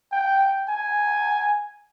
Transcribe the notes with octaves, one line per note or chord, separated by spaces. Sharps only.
G5
G#5